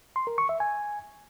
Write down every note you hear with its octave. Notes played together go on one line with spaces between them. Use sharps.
C6
A#4
C#6
E5
G#5